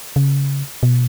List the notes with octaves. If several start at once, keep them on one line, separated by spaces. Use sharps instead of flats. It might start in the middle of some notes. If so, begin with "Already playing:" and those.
C#3
B2